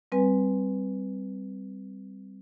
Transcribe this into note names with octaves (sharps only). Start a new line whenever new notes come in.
G3 C4 B4 G#5